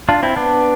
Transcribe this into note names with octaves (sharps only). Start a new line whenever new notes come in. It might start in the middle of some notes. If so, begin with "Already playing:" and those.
D4 F4
C4 E4
B3 D4